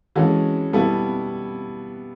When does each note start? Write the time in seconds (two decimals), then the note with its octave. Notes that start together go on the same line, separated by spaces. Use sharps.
0.16 E3 G#3 C#4 F#4 A4
0.73 B2 G3 B3 E4 A4